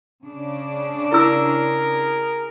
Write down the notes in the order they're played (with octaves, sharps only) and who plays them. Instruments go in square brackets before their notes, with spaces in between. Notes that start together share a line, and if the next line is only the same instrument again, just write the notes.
[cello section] C#3 D4
[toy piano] E4 E6 [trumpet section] G#4 A#4